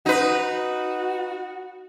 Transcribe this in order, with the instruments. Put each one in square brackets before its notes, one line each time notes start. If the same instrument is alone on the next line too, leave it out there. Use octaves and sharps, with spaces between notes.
[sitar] D#4 B4 [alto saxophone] F#4